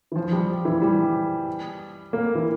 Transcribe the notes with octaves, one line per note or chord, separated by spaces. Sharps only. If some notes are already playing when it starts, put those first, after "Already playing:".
E3
F3
G3
E3
G3
A#3
E3